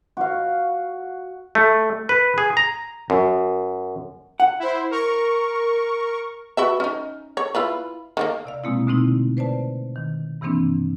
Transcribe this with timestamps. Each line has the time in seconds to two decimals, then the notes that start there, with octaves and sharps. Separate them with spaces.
0.17 F#4 F5
1.55 A3
2.09 B4
2.38 G#4
2.57 A#5
3.10 F#2
4.40 F#5
4.59 E4 C5
4.91 A#4 C#6
6.57 F#4 B4 E5
6.80 C#4 D#4
7.37 C#5
7.55 E4 F4 B4
8.17 D#3 F#3 A#3
8.45 C3 D5 F5
8.64 B2 G#3 A#3 C4 E4
8.87 B2 D3 A3 C4 D#4 E4
9.37 B4 C5 D5 A5
9.96 D#3
10.41 G2 C3 E3 A#3 C4 D4